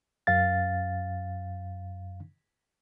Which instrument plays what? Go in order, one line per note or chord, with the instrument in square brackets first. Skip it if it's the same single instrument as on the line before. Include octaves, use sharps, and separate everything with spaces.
[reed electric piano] F#2 F5 A6